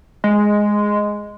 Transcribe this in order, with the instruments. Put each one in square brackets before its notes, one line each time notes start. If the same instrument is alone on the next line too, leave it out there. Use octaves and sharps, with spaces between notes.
[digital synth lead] G#3